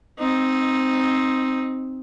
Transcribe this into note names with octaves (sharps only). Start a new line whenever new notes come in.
C4 D#4